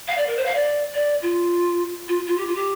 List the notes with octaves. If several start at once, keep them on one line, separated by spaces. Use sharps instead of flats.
F5
D5
A#4
C5
F5
D5
D5
F4
F4
F4
G4
F4
G4